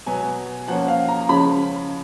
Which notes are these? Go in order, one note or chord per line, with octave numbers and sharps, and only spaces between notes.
B2 F#3 B3 G#5
F3 A#3 C#4 F#5
F5
A#5
C#3 F3 G#3 C#4 B5